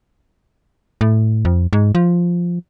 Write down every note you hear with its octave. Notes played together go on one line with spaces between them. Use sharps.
A2
F2
G#2
F3